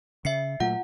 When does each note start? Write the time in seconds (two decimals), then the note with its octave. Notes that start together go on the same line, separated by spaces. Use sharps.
0.25 C#3 E5 C7 C#7
0.60 A#2 F#3 A3 F4 F#5